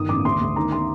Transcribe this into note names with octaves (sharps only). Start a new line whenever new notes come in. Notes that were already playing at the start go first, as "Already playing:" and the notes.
Already playing: G1 D#3 D#6
A1 D6
D2 C6
D2
D#3 A#5
C6